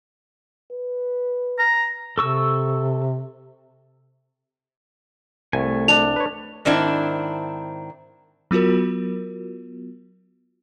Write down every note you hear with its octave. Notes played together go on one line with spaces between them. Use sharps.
B4
A#5
C3 A4 C#6 E6
C2 A3 G#5
D4 F7
B4 C#5
G#2 D#3 C4 D4 E4
F#3 B3 F4 F#4 A#4